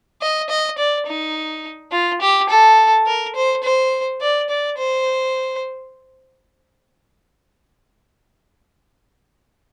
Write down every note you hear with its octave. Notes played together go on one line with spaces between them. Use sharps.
D#5
D#5
D5
D#4
F4
G4
A4
A#4
C5
C5
D5
D5
C5